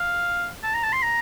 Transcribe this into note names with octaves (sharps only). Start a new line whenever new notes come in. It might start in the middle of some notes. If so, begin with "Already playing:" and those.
Already playing: F5
A5
A#5
A5
C6
A#5